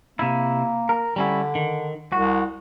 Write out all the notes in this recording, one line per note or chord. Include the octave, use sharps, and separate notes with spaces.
C3 A#3 E4
A#4
D3 G3 C#4 E4
D#3
C2 F#4